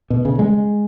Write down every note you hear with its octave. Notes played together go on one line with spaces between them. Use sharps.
B2
C#3
G#3